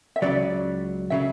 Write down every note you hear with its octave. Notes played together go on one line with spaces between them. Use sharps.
E5
C#2 C#3 F#3 D5
C#3 F#3 E5